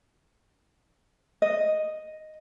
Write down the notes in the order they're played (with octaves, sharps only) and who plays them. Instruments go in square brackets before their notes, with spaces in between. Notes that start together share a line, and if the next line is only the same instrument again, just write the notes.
[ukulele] D#5